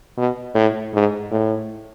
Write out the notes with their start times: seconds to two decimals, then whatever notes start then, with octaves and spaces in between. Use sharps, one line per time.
0.17 B2
0.55 A2
0.94 G#2
1.31 A2